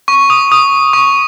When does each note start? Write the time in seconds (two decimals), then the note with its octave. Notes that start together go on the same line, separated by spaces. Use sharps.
0.08 C#6
0.30 D#6
0.52 D#6
0.93 C#6